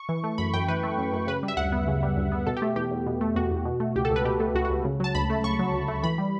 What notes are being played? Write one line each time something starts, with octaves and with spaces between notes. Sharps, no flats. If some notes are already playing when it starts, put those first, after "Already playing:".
Already playing: C#6
E3
A3
F#2 B5
F#2 G5
E3 B4
A3
F#2
F#2
C#3 B4
G3
E5
D2 F#5
B3
C#3
G3
D2
B3
B2 A4
G4
A3
E2 G4
E2
B2
A3
E2 F#4
E2
B2
A3
C#2 G4
A4
C#2
B4
B2 G4
A3
C#2 F#4
F#4
C#2
C#3
F#3 A5
D2 B5
A3
C#3 C#6
F#3
D2
A3
E3 B5
G3